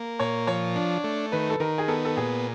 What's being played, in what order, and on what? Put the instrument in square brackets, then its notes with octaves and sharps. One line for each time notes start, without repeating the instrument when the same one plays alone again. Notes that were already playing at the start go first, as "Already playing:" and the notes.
Already playing: [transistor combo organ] A#3
[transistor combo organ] A#2 [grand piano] C#5
[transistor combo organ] F3 [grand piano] C#5
[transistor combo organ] D4
A3
[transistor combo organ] D#3 [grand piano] B4
[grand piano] A4
[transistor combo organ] D#3 [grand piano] A#4
[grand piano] G#4
[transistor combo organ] B3 [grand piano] A4
[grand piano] A4
[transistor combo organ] A#2 [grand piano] G#4